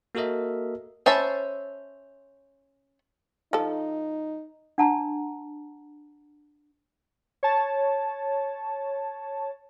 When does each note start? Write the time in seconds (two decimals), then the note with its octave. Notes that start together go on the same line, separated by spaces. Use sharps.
0.15 A#3 F#4 A4 A#4 D#5 E5
1.06 C#4 C5 E5 A5 B5
3.53 F3 D#4 A4
4.78 D4 F#5 A5 A#5
7.43 C#5 A5